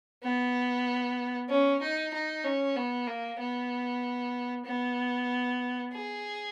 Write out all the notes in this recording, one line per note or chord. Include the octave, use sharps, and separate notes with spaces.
B3
C#4
D#4
D#4
C#4
B3
A#3
B3
B3
G#4